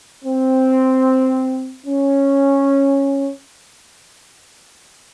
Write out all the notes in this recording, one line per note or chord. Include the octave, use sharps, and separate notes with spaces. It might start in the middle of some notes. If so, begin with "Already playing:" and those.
C4
C#4